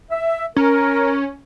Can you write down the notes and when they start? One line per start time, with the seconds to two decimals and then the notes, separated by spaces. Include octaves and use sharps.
0.11 E5
0.56 C#4 A#4